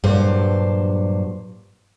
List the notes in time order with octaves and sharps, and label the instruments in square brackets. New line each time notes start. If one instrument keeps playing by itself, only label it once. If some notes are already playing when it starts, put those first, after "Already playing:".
[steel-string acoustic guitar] G2 A#2 F#3 D4 C5